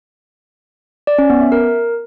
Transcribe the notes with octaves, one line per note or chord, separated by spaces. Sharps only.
D5
C#4
B3
E5
A#4